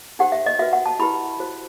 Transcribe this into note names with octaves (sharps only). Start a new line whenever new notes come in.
D#4 G4 C5 F#5
E5
D#5
F#4 B4 E5
F#5
A5
E4 G4 B4 B5
F#4 C5